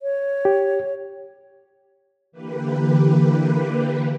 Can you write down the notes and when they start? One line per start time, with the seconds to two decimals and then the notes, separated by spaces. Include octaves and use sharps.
0.02 C#5
0.45 G4
2.32 D3 E3 A#3 G4 B4